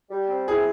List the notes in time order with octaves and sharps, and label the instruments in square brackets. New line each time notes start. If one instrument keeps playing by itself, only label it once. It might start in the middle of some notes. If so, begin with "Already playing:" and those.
[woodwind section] G3
C4
[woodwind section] E4 [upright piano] G#4